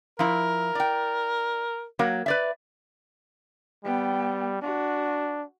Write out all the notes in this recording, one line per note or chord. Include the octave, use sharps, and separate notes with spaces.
F3 E4 A#4
D5 G5
F#3 A#3 A#4
B4 D5 E5
G3 B3 G5
D4 F#4